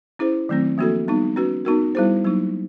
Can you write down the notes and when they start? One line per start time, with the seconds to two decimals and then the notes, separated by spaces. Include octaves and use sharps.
0.19 C#4 E4 G#4 C5
0.49 D#3 F#3 A3 C4
0.78 F3 A#3 D4 F#4 A4
1.08 G3 B3 D#4
1.36 C#4 F#4 B4
1.65 B3 D#4 F#4 A#4
1.95 G3 B3 E4 G#4 C5
2.24 F#3 A#3 D#4